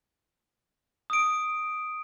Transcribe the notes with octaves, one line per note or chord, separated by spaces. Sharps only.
D#6 D7